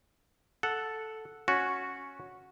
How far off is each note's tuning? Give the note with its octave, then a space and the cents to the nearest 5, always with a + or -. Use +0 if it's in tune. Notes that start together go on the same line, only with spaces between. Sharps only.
A4 +0 F#5 -5
C#4 +0 F#4 -10